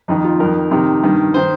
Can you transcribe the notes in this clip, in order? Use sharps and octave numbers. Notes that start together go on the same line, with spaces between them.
F2 D#3 D#4
F4
F2 D#3 A#4
F2 C3 D#3
G2 D#3
D#3 C5